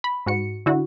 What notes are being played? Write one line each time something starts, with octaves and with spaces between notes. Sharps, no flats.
B5
G#2 F#4 C#7
D3 E4 F#4